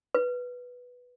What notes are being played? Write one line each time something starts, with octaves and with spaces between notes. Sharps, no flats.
B4